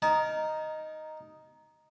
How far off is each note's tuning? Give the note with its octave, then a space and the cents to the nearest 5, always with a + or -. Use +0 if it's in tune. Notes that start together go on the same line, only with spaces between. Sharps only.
D#4 +0 A#4 +0 A5 -45